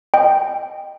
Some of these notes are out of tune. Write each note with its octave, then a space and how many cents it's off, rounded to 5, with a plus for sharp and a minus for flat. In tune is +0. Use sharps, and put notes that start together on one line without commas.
D#5 -20 G5 +0